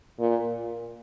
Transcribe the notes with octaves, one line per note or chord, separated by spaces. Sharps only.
A#2